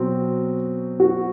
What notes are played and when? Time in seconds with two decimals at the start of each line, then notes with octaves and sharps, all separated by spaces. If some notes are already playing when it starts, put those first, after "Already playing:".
Already playing: B2 F#3 C4
1.00 F#4